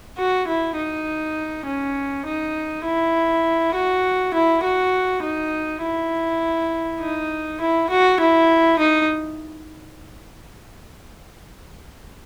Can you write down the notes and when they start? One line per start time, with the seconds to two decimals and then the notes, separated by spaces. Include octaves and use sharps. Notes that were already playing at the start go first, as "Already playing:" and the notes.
0.18 F#4
0.47 E4
0.76 D#4
1.66 C#4
2.26 D#4
2.84 E4
3.74 F#4
4.34 E4
4.63 F#4
5.22 D#4
5.82 E4
7.00 D#4
7.60 E4
7.89 F#4
8.19 E4
8.79 D#4